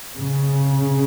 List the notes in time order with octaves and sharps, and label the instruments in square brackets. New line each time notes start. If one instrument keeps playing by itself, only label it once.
[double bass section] C#3